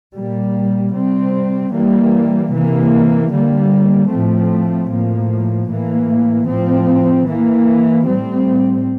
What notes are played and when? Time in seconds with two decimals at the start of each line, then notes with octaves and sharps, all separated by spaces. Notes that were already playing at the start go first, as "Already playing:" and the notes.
0.15 A#2 G3 A#3
0.94 C3 G3 C4
1.72 E3 G3 A#3
2.53 C3 E3 A#3
3.31 D3 G3 A#3
4.10 A2 F3 A3 C4
4.89 A2 F3 A#3
5.68 A2 E3 A#3
6.48 A2 F3 C4
7.26 E3 A#3
8.06 A2 G3 C4